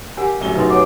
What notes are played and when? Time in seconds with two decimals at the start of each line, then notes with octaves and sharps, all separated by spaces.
0.17 G4 A#4 F#5 G#5
0.40 D1 F#2 G7
0.55 B2 D#4 B4 C6
0.70 C#5 F#5 D6